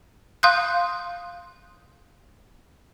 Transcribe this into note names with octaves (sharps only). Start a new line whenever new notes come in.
F5 C6 D#6 F#6 G6